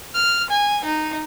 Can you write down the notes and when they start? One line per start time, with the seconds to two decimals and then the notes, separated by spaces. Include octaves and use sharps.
0.14 F6
0.50 G#5
0.84 D#4